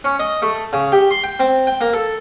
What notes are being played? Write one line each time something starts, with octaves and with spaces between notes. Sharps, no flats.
C#4
D#5
A3
C#3
G4
C6
G5
C4
G5
A#3
A4